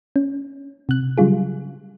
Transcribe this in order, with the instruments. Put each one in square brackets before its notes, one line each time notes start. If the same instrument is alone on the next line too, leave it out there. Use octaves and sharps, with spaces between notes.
[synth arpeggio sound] C#4
C3 F#6
C#3 F#3 G3 F4 G#4